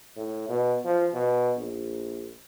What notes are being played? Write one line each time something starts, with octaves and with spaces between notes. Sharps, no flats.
A2
B2
F3
B2
A#1